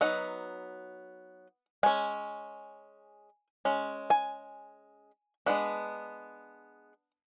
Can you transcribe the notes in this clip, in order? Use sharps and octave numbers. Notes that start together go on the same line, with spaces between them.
F#3 B3 D#4 F#5
G#3 C#4 G#5
G#3 C#4
G#5
G#3 B3 D4 F#5